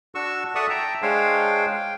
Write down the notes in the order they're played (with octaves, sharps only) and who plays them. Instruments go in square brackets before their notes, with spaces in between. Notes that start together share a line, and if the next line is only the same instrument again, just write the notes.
[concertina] D4 F#4 C#6 E6
A4 D5 E5 F#5 C#6 D#6
E5 G5 A5 A#5
G#3 D4 C5 C#5 F5 G5
F5 G5